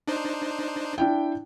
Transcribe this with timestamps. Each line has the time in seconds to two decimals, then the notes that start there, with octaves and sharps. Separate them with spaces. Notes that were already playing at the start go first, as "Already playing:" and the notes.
0.08 D4 D#4 C5
0.98 D4 E4 G5